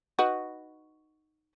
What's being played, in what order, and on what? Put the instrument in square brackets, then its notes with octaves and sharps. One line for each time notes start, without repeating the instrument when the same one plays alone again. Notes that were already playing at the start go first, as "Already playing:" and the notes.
[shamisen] D#4 F#4 B4